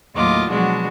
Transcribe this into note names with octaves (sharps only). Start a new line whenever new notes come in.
D#2 A2 F#3 F4 D#5 D6
B2 F3 F#3 G#3 D4 F#4